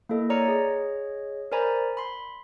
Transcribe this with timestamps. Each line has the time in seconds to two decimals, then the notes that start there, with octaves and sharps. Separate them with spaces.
0.09 A#3 E4 A4 D#5
0.30 C#5 D5 A#5 F6 C#7
0.48 G#4 C#5 D#5
1.52 A#4 C5 D5 G#5 A#5 B5
1.97 B5 C6